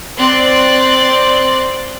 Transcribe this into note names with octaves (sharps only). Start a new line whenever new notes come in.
C4 D5 C6 F#6